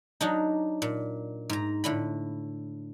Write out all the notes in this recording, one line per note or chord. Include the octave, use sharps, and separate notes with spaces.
F#3 D4 D#4
A#2
G#2 A#5
A2 D3 B5